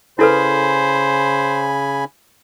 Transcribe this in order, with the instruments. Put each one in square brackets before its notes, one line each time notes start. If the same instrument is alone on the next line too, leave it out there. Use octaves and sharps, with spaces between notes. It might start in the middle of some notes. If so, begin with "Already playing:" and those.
[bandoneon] C#3 G#5 B5 [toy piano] E4 A4 B4 [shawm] C5